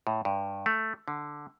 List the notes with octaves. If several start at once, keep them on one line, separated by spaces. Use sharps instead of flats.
A2
G2
A3
D3